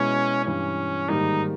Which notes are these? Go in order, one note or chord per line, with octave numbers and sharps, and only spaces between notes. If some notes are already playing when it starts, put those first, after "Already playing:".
Already playing: B2 G#3 B3 C#4 E4
G2 E3 G3 C#4
G#2 D#3 G3 A#3 D#4